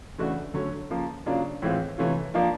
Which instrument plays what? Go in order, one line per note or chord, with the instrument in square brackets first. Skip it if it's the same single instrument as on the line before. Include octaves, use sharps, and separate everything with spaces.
[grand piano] C#3 E3 A3 D4 F#4
D3 F#3 A3 C#4
C#3 F3 A#3
C#3 F#3 A#3 D4 F4
A2 E3 G#3 C4 F4
C3 E3 A3 C#4 F4
F3 A#3 D4 F4